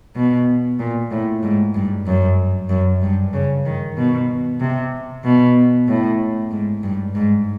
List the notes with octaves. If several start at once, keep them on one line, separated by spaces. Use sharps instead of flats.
B2
A#2
A2
G#2
G2
F#2
F#2
G2
C#3
D#3
B2
C3
B2
A2
G#2
G2
G#2